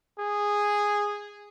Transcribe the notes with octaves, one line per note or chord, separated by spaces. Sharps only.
G#4